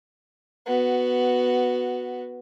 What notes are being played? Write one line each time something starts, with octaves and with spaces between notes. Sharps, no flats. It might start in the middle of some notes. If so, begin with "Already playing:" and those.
B3 F#4